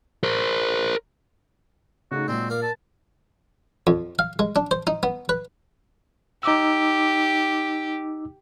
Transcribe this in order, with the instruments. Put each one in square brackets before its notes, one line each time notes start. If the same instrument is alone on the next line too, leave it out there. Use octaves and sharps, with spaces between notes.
[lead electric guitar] A#4 C5
[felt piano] C#3 A3 D#4 [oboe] F#4
[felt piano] A#2 [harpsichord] F#3 G#3 [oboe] C4
[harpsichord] A#4 D5 [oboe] F5
[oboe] A5
[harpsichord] F2
F5
G#3
D4
C5
D#4
B3
B4
[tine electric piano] D#4 D6 E6 [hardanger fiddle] G4